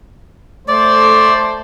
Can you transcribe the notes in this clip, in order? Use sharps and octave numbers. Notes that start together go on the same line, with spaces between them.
A3 C5 D5